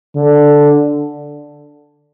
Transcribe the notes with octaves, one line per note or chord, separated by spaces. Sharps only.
D3